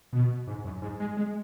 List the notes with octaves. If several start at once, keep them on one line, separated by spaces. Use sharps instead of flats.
B2
G#2
F#2
G#2
G#3
G#3